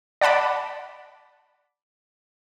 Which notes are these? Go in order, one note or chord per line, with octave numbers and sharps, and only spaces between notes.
D5 F#5 A5 B5 D6